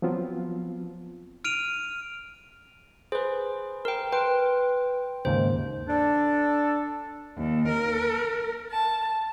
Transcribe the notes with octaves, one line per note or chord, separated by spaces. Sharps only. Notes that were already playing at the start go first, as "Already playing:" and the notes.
F3 F#3 B3 C4 F4
F6 D7 D#7 F7
G#4 B4 C5
A#4 G5
B4 G5 C6
D#2 G#2 C#3 C5
D4 A4
D#2
A#4
A5